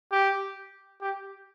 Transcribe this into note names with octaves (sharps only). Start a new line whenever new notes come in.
G4
G4